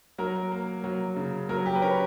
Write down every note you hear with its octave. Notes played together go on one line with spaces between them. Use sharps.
F#3 A#4
A#3
F#3
C#3
F#3 A#4
G4
B4
C#4 A#4